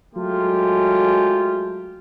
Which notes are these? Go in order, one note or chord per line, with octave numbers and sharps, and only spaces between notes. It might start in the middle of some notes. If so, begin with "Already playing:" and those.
F#3 G#3 A3 F4 G4